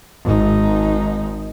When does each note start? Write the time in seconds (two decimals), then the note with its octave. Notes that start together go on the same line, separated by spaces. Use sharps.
0.24 G#1 D#4